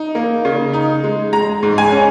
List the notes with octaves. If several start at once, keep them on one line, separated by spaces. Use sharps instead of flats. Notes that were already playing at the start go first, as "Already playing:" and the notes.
Already playing: D#4
A#3
C#3
D#4
G#3
G#3 A#5
G#2
G#5
C#4